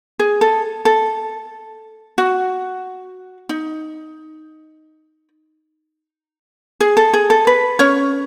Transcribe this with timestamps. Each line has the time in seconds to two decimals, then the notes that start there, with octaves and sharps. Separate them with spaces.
0.19 G#4
0.41 A4
0.85 A4
2.18 F#4
3.49 D#4
6.80 G#4
6.97 A4
7.13 G#4
7.30 A4
7.47 B4
7.79 C#4 C#5